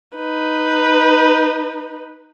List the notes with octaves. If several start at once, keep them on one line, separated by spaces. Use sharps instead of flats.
D#4 B4